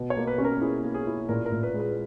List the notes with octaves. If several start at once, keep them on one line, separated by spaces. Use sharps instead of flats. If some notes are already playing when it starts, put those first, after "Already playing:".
Already playing: B2
C#5
A#3
B4
C#4
A#4
E4 G#4
A#3
G#4
E4
A#2 A#4
A#4
A#2
B4
G#3
B4